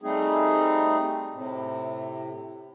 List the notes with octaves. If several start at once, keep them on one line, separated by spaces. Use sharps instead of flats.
G3 A3 C4 D#4 G#4
A2 C3